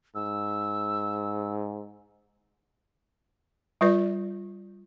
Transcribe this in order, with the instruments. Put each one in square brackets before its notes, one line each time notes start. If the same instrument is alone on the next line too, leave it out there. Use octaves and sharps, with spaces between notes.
[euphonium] G#2 [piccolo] E6
[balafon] G3 F4 B4 D5